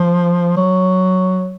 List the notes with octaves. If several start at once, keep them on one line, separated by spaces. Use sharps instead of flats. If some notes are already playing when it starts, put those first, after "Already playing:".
Already playing: F3
F#3